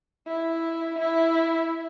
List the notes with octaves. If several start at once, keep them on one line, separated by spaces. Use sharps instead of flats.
E4
E4